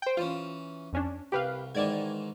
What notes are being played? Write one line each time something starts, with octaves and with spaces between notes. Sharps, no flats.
C5 G5
E3 C#4 F4
F2 C#4 D4
C2 G4 B4 F5
G#2 D#3 E3 D5 G#6